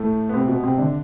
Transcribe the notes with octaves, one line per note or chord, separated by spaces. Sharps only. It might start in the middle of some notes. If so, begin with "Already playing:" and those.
Already playing: A2 A3
B3
C3 C4
B2 B3
C3 C4
D3 D4